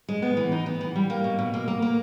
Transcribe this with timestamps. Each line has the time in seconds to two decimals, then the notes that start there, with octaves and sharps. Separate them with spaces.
0.09 G#3
0.22 B3
0.37 E3
0.52 D#4
0.66 B3
0.81 E3
0.96 G3
1.10 A#3
1.24 B2
1.39 B2
1.54 A#3
1.68 A#3
1.82 A#3